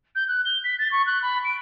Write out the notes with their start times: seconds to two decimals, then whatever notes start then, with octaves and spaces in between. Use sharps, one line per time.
0.15 G6
0.28 F#6
0.45 G7
0.64 B6
0.78 A6
0.91 C#6
1.06 F#6
1.22 B5
1.44 D7